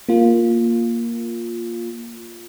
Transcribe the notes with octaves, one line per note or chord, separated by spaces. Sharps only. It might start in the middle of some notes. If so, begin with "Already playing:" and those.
A#3 F4